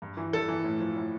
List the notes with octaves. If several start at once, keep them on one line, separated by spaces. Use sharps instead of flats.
G2
E3
G2 A4
E3
A2
F3
A2